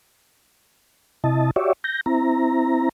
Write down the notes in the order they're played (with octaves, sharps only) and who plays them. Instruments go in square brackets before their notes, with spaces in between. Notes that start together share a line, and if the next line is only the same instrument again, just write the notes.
[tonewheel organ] C3 E4 D#5 A5
F#4 G4 C#5 D5 E5
G6 A#6
C4 E4 A#5